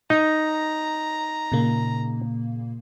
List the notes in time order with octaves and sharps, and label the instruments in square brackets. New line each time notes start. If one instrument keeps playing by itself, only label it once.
[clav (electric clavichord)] D#4 [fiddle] A#5
[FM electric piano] A#2 C#3 A#3